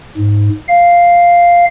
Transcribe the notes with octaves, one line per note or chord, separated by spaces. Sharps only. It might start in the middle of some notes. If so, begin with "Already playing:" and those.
G#2
F5